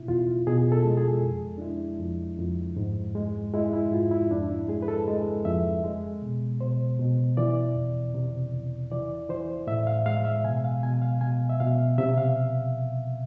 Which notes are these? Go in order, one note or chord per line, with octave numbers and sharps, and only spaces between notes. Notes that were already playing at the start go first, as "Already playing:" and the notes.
Already playing: B2 E4
E2 F4
B2 G#4
A4
G#3
G#4
F2
D4
G#3 E4
F2
F2
G#2
G#3
G#3 E4
E4
G#2 F4
E4
F2 D4
E4
G#3 G#4
B4
A4
G#3
F2 E5
G#3
B2
B2 C5
B2
E3 D5
E2
C3
E2
E3 D5
E3 C5
A2 E5
F5
G#3 F5
E5
B2 G#5
F5
B2 G#5
F5
B2 G#5
E5
B2 F5
C3 E5
F5